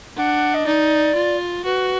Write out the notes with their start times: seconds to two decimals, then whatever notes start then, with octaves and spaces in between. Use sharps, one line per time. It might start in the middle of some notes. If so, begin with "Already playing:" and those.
0.16 D4 F#5
0.54 D#5
0.66 D#4 D5
1.15 F4
1.65 F#4 B4